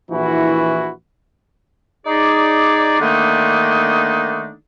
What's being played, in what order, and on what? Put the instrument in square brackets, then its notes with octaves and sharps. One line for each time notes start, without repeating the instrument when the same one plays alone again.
[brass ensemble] A#1 E3 E4 F#4
[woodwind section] D#4 G#4 D5
D3 D#3 A3 A#3 D4 D#4